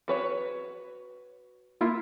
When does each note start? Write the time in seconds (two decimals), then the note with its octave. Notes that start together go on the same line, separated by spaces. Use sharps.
0.08 F#4 B4 C#5
1.81 A#3 E4 F4